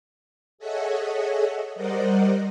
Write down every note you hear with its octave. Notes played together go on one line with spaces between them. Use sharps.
G#4 A4 C#5 D#5 E5 F#5
G3 A#4 C5 D5 D#5 F#5